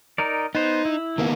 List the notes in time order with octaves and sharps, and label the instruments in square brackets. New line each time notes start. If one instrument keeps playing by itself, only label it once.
[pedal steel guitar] D#4 A#4 D5
[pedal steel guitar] B3 C5 [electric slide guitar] D#4
[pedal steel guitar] E4
[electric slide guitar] D#3 A#3 B3